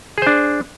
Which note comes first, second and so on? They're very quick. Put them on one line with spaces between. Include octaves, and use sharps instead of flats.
G#4 C5 D4